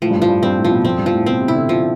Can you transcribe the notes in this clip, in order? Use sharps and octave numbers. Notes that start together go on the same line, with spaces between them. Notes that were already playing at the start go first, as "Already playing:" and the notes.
A2 F3
G2
A2
F3
G2
G2 C4
A2
F3
B2
F2 C4
G2
F3
A2
B2 C4
C3
E4
D3
F3